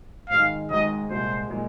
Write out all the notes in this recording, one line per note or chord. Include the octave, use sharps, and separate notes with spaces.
G#1 G#2 D#3 G#3 F5
G#1 G#2 D#3 G#3 D#5
C2 A#2 G#3 C5
A#2 G#3